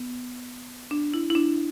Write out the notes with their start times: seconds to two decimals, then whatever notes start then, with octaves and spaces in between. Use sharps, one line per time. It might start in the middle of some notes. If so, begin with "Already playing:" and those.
Already playing: B3
0.91 D4
1.14 E4
1.30 E4
1.35 D4